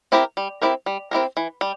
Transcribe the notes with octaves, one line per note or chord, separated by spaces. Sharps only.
C4 E4 G4 A#4
G3
C4 E4 G4 A#4
G3
C4 E4 G4 A#4
E3
G3